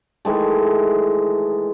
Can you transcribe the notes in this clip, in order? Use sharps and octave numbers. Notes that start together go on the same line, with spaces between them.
D#3 E3 G#3 A3